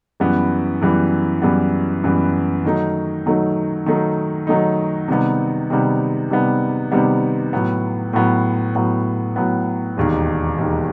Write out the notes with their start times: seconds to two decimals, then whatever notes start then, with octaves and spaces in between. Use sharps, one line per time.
0.20 F#2 E3 G3 B3
0.81 F#2 E3 G3 B3
1.42 F#2 E3 G3 B3
2.04 F#2 E3 G3 B3
2.65 D#3 F#3 A3 D#4
3.26 D#3 F#3 A3 D#4
3.86 D#3 F#3 A3 D#4
4.47 D#3 F#3 A3 D#4
5.08 C3 D#3 G3 B3
5.70 C3 D#3 G3 B3
6.30 C3 D#3 G3 B3
6.92 C3 D#3 G3 B3
7.53 A2 F#3 B3
8.13 A2 F#3 B3
8.75 A2 F#3 B3
9.36 A2 F#3 B3
9.97 E1 D#2 D#3
10.58 E1 D#2 D#3